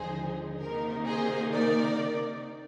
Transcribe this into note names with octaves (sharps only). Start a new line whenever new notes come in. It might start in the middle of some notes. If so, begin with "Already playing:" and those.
Already playing: D#2 D3 F3 G#3 D#4 G#4 C5
C3 D#3 A#3 D#4 A#4
G#4 C5
A#4 D5